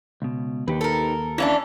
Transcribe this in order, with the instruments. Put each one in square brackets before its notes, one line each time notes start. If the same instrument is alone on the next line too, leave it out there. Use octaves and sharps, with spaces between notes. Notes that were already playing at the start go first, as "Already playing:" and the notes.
[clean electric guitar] C#2 B2
[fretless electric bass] D#2 [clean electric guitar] D#4 G4 B4
[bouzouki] A4 A#4
[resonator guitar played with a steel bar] E3 C#4 D4 [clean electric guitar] E4 B4 F5